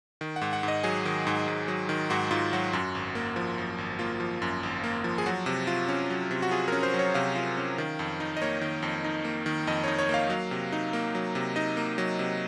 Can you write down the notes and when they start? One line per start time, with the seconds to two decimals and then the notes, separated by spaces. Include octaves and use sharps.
0.21 D#3
0.36 F#5
0.41 G#2
0.53 F#5
0.63 G#2
0.68 D#5
0.83 F#3 G#4
1.05 D#3
1.27 G#2
1.48 G#2
1.68 F#3
1.89 D#3
2.10 G#2 F#4
2.31 G#2 F4
2.53 F#3 F#4
2.73 F#2
2.95 G#1
3.15 A#3
3.36 F3
3.58 F#2
3.78 G#1
3.99 A#3 F4
4.20 F3
4.42 F#2
4.63 G#1
4.84 A#3
5.04 F3
5.18 G#4
5.26 F#3 F#4
5.46 C3
5.67 F4
5.88 C#4
6.10 F#3
6.31 C3
6.42 F#4
6.51 F4 G#4
6.68 C#4 A#4
6.83 C5
6.94 F#3
6.99 C#5
7.14 C3 F5
7.35 F4
7.57 C#4
7.78 D#3
7.99 F2
8.20 D#4
8.37 D#5
8.42 A#3 C#5
8.61 D#3
8.82 F2
9.04 D#4
9.25 A#3
9.46 D#3
9.67 F2 D#5
9.84 D#4 C#5
9.99 C#5
10.09 A#3 F5
10.30 F#3
10.51 C3
10.72 D#4
10.93 A#3
11.15 F#3
11.35 C3
11.56 D#4 D#5
11.77 A#3
11.98 F#3
12.19 C3